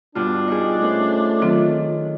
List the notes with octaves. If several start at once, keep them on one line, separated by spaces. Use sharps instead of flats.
G2 B2 D4 F4
D#4 G4 G#4
A3 C#4 C5
D#3 F#3 C4 F4